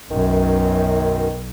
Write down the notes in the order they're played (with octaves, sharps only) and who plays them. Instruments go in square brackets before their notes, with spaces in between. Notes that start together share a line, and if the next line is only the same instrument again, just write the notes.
[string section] B1 [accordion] F#2 [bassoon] D#3